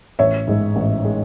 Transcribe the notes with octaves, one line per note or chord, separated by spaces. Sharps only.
A1 C#5 E5
G#2 G#3
A1
G#3